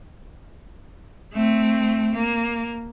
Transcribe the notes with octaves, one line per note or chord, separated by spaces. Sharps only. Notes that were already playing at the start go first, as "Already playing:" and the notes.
A3 C4
A#3